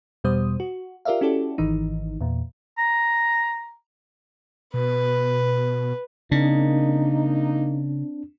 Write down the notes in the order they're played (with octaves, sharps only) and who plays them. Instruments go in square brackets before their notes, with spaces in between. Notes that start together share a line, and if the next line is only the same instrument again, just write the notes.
[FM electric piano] E2 B2 G3 C5 D#6
F#4
F4 G4 A#4 D5 E5 F5
C#4 E4 F#4 G4 A4 D5
G#1 D#3 E3 D#4
E2 A#2
[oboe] A#5
[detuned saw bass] B2 [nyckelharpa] B4
[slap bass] C#3 [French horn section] A#3 D#4 [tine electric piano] C4 D4